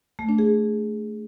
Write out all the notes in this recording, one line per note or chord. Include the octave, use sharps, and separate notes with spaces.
A3
D4
G#4